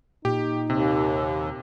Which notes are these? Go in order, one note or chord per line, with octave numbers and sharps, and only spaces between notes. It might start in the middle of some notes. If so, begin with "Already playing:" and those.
A#2 D#4 G4
D#2 C3